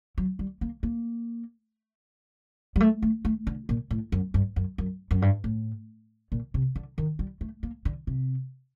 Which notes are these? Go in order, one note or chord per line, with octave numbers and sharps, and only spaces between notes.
F#3
G3
A#3
A#3
G3
A3
A3
A3
D3
A#2
A2
F#2
G2
F#2
F#2
F#2
G2
A2
A#2
C3
D3
D#3
G3
A3
A#3
D3
C3